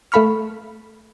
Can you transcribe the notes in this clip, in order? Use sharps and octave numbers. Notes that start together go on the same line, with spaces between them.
A3 A4 F5 B5 C#6 F6